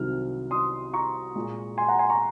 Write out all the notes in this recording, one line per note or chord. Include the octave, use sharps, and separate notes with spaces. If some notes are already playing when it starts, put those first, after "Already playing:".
Already playing: C2 C3 D#3 F#3 F6
C6 D#6
A#5 C#6
A#2 G#3
G#5 C6
F#5 A#5
G#5 C6
A#5 C#6